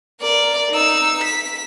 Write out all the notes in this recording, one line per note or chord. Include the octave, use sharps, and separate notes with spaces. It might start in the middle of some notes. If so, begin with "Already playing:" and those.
A#4 D5
D#4 E6
B6